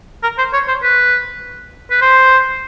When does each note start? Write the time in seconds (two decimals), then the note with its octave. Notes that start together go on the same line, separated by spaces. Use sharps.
0.23 A#4
0.38 C5
0.53 C#5
0.68 C5
0.83 B4
1.91 B4
2.02 C5